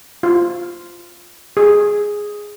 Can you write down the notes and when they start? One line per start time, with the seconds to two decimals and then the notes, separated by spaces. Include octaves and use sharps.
0.23 F4
1.57 G#4